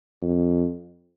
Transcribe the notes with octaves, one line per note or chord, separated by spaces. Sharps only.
F2